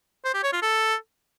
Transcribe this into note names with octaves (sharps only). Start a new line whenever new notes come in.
C5
G4
C#5
F4
A4